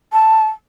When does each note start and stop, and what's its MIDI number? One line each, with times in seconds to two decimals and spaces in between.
0.13 0.46 81